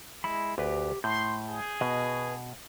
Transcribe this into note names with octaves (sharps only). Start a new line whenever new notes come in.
G#3 E4 B5
D2 G4 B4
A2 C6 G6
G#4
B2 B4 D#5